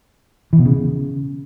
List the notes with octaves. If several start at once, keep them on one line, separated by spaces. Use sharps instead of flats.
E3
B2
C#3